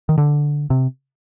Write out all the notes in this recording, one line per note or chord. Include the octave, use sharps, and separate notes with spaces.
D#3
D3
C3